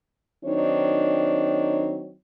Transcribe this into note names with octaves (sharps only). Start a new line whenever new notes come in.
D#3 F#3 C4 D4 D#4 C#5